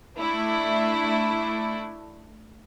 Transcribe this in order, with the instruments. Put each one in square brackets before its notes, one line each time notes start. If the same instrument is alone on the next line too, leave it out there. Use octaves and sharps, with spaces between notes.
[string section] A3 D4 E4